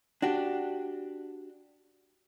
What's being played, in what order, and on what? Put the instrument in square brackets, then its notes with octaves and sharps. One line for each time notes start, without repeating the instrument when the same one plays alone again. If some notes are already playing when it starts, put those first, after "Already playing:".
[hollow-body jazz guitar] D4 F#4 G4